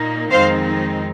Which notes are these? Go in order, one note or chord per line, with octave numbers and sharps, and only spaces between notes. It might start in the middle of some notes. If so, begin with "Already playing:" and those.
Already playing: A#2 A#3 D#4
F2 D#3 G#3 C4 D#4 C5 F5